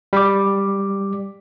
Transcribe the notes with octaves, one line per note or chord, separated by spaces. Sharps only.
G3 D6